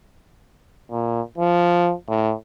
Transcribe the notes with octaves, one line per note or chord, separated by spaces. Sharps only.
A#2
F3
A2